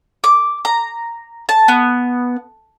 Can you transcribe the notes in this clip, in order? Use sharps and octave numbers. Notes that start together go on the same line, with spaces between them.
D6
A#5
A5
B3